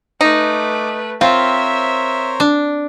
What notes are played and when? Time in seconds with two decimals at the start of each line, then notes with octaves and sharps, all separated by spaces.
0.21 A3 D#4 B4 D6
1.21 C4 F4 A#4 C5 C#5 E5
2.40 D4